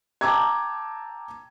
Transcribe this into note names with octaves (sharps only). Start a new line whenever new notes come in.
G5 A5 A#5 D6 E6 G#6